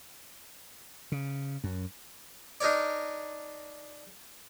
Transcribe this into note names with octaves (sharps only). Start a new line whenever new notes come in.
C#3
F#2
D4 D#4 A#4 C#5 D5